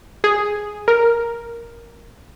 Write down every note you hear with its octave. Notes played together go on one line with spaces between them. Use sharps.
G#4
A#4